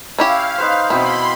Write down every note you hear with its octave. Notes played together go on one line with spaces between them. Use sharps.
C#4 E4 G4 F5
D#4 B4 C5
B2 E3 C4 E4 B5 C6